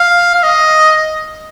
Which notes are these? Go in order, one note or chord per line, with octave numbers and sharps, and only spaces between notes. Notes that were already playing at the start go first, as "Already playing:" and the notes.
Already playing: F5
F5
D#5